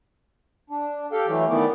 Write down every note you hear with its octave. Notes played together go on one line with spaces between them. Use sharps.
D4
G4 A4 F5 G5
E3 F#3 A3
D#3 E3 A3 B3 D5